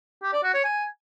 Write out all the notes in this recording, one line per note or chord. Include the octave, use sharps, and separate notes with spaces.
G4
D5
F#4
C#5
G#5